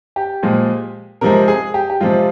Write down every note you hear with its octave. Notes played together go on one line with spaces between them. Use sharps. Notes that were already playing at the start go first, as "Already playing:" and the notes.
G4
A#2 F3 G#3
C3 F3 G#3 A#4
G#4
G4
G4
C3 F3 G#3 F4